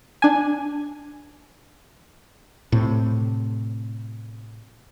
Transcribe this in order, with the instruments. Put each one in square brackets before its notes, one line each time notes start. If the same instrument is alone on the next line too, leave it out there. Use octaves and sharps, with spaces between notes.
[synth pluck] D4 G#5
[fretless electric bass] A2 C3